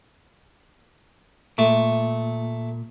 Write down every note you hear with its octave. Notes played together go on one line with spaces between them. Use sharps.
A#2 A3